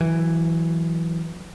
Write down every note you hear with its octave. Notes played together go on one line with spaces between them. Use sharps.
E3 F#3